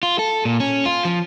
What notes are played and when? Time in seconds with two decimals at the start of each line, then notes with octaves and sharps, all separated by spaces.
0.03 F4
0.19 A4
0.45 A#2
0.60 C#4
0.86 F4
1.05 F3